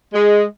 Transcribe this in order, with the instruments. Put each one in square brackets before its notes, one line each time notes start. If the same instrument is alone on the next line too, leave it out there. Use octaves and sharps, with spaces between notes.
[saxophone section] G#3